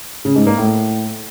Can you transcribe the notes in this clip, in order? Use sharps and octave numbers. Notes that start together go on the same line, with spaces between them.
C#3
G#2
A#3
A2